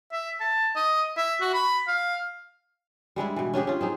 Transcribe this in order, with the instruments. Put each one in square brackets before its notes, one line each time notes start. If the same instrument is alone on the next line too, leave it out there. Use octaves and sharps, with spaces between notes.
[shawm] E5
A5
D#5
E5
F#4
B5
F5
[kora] G3 G#3 D4 E4
B2 E3
C#4 D4 G4 G#4
C#4 F4
C4 D#4 G#4